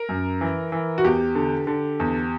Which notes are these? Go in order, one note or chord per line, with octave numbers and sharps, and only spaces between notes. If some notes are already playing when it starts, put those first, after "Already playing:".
Already playing: A#4
F#2
E3
E3
F#4
E2 G4
D3
D3
E2